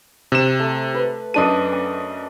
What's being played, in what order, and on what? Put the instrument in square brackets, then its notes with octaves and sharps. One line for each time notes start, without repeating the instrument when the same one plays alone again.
[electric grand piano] C3 E7
[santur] A3
B4
[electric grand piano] F#2 D4 D#7 [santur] A4 D5 D#5
[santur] C#4